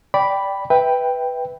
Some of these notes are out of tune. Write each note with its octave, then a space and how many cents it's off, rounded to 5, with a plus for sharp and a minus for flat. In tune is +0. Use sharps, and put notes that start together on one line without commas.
D5 -10 G5 +0 B5 +0
B4 +0 E5 -15 G5 +5